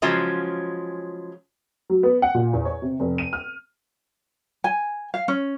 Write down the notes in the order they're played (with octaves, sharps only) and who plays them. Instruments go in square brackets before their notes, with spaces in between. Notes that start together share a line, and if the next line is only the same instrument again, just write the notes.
[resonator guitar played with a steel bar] C#3 F3 F#3 G#3 C#4
[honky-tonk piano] F#3
B3
F#5
A#2
E2
C#5
C3
F1
D#7
F6
[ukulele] G#5
F5
C#4